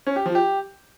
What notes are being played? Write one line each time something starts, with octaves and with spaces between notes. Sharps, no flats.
C#4
G4
F3
G4